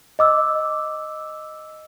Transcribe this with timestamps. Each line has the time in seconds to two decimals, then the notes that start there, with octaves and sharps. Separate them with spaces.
0.19 D#5 D6 E6